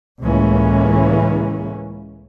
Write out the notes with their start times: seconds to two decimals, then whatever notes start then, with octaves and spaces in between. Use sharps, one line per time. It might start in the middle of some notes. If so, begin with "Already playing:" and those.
0.22 C#2 A2 E3 G#3 A#3 C#4